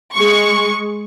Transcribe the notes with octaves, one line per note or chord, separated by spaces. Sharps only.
G#3 C#6